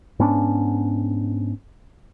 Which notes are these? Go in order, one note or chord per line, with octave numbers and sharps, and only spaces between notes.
G#2 B3 C#4 D4